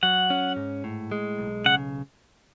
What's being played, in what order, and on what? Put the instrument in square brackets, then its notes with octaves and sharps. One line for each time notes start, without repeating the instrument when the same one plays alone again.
[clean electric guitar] F#3 [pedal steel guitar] F#5
[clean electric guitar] C#4
G#2
A2
G#3
B1
[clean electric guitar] C#3 [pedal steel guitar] F#5